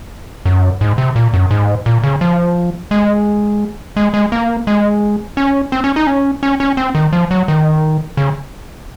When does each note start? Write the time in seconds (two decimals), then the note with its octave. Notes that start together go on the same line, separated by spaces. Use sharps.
0.46 F#2
0.81 G#2
0.98 C3
1.16 A#2
1.34 F#2
1.51 G#2
1.86 A#2
2.04 C#3
2.21 F3
2.91 G#3
3.97 G#3
4.14 G#3
4.32 A#3
4.67 G#3
5.37 C#4
5.72 C4
5.84 C#4
5.96 D#4
6.07 C#4
6.43 C#4
6.60 C#4
6.77 C4
6.95 D#3
7.13 F3
7.31 F#3
7.48 D#3
8.17 C#3